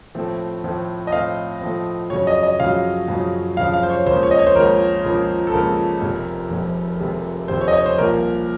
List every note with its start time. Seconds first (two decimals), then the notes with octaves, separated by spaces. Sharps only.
0.15 A2 F3 A3 C4
0.64 A2 F3 A3 C4
1.07 D#5
1.12 A2 F3 A3 C4 F5
1.61 A2 F3 A3 C4
2.10 F#2 C#3 F3 C#5
2.27 D#5
2.43 D#5
2.60 F#2 C#3 F3 F5
3.08 F#2 C#3 F3
3.57 F#2 C#3 F3 F5
3.74 F5
3.83 C5
3.90 C#5
4.06 C#2 C#3 F3 A#3 C5
4.23 C#5
4.31 D#5
4.39 C#5
4.47 C5
4.55 C#2 C#3 F3 A#3 A#4
5.04 C#2 C#3 F3 A#3
5.47 A4
5.53 C#2 C#3 F3 A#3 A#4
6.02 F1 F2 C3
6.50 F1 F2 C3
7.00 F1 F2 C3
7.48 F1 F2 C3 C5
7.61 C#5
7.68 D#5
7.73 C#5
7.86 C5
7.98 C2 A#2 F3 A#4